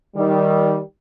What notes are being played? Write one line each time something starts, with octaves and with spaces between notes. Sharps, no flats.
D#3 G3